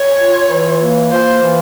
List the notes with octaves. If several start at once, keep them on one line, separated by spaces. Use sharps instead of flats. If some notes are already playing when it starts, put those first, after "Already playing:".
Already playing: C#5
F4
E3
A#3
F4 C5
E3